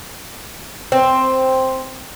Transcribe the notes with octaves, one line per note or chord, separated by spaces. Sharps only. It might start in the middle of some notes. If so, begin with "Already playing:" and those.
C4